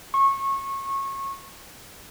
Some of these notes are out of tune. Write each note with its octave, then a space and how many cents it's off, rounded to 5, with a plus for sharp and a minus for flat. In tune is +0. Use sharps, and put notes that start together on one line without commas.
C#6 -25